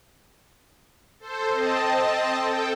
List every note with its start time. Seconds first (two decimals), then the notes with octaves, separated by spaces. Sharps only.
1.20 A4 C5
1.50 C4 D#5 A5
2.40 A4 G5